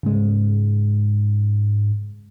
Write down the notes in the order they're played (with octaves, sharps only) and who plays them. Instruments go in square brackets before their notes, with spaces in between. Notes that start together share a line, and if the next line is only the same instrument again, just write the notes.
[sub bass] G#2 [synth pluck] C#3 G#3